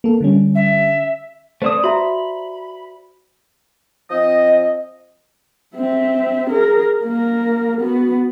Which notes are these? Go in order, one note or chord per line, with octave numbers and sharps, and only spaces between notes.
A#3 A4
D3 G3 C#4
E5
A3 C4 C5 D5 D#6
F#4 E5 A#5 B5
F3 C4 D#5
C4 E5
G#4 A#4
A#3 A#4
B3 F#4